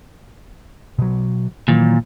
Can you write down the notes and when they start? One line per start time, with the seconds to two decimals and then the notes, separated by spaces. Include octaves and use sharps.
0.99 B2 F#3
1.68 A#2 D#3 E3 F#3